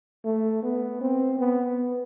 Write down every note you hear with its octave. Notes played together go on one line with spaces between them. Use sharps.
A3
B3
C4
B3